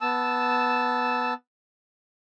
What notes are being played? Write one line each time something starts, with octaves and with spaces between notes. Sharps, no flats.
B3 A5 E6